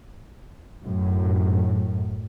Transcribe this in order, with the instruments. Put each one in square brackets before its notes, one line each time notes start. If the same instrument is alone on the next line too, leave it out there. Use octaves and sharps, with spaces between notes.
[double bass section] F#2 A2